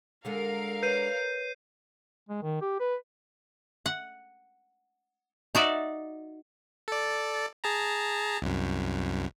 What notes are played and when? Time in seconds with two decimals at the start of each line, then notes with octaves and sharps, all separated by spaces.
0.25 D3 G#3 A4 A#4 F5
0.83 B4 C#5 G6 C7 D#7
2.29 G#3
2.43 D#3
2.61 G4
2.80 B4
3.86 F#5
5.55 D#4 F#4 D5 E5
6.88 A4 D5
7.64 G#4 A5 A#5
8.42 C2 F#2